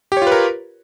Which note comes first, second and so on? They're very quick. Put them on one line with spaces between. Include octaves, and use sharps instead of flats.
G4 C#5 F4 B4 A#4